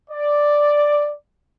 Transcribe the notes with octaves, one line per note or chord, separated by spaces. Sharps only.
D5